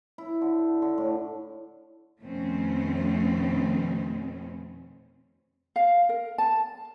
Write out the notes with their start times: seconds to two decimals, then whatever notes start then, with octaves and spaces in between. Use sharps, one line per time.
0.18 E4
0.41 D3
0.82 D3
0.98 A2
2.22 F2 B2 D#3 A3 C4 C#4
5.76 F5
6.09 A#4
6.38 A5